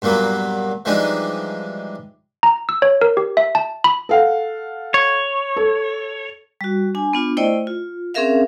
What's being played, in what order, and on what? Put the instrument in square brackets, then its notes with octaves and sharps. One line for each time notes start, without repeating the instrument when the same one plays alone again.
[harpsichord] G2 A#2 F#3 A#3 B3
E3 F3 G3 G#3 D4 D#4
[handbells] A#5
E6
C#5
A#4
G4
E5
A5
B5
[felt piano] A4 F5 F#5
[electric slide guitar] C#5
[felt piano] A4
[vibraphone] G3 F#4
D4 G#5
B3 D4 F4
A3 E4 C5 D5 D#5 G5
F4
C4 C#4 G#4 A#4 E5 F5